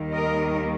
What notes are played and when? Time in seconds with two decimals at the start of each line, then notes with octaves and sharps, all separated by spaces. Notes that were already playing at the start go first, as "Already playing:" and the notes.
Already playing: D#2 D#3 G3 A#3
0.12 A#4 D#5